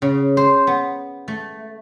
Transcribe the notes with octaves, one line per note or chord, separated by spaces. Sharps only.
C#3
C5
B3
A3